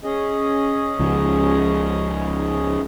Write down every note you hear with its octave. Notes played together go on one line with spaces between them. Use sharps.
C#4 G#4 D#5
C#2 C#3 F3